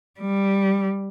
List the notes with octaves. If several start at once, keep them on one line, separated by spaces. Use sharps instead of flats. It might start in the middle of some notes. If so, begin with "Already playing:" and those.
G3